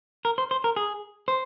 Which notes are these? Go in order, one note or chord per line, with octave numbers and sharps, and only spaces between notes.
A#4
C5
C5
A#4
G#4
C5